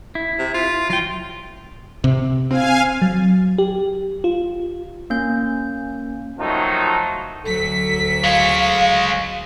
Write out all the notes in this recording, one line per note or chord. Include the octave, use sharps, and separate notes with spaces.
E4
C3
F4
F#3 F4 G5
C3
C4 F5 G#5
F#3
G4
F4
A#3 C#4 G6
D#3 F3 F#3 A3 D#4
D2 F#3 A4 B6
G#3 C#5 F5